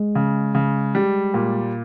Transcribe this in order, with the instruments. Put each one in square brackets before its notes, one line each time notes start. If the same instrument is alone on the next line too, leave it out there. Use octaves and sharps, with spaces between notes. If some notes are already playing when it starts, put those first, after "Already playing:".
Already playing: [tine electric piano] G#3
[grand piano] C#3
C#3
G3
A#2